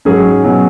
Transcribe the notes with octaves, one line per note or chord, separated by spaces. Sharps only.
G#2 F#3 C#4 G#4
B2 F#3 C#4